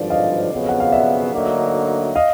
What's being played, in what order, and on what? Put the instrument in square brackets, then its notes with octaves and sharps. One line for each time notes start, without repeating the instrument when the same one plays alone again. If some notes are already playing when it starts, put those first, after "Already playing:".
Already playing: [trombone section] G#1 G2 D3 F3 [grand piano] D5
[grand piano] D#5 F5
[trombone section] F2 C#3 F#3 B3
[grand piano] F#5
F5
D5 E5
[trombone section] D2 D3 F#3 A#3 D#4
[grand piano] D#5 F5